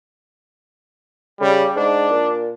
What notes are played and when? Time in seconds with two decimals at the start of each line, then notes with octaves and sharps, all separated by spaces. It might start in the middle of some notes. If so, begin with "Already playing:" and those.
1.40 C#3 G3
1.76 G#2 D4
2.10 A#2